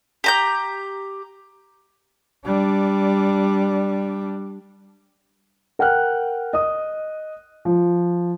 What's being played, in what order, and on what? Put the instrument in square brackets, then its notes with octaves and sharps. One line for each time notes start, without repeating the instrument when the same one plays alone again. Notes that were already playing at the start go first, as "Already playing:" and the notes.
[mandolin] G4 A#5 G6
[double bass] G3 D4
[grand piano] A#4 F#5 G5 F6 F#6
D#5 D#6
F3